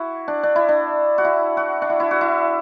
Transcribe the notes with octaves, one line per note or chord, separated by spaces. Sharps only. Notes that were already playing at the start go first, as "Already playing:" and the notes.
Already playing: E4 F#4
D4
D4
E4
D4
F#4
E4
F#4
D4
E4
E4
F#4
E4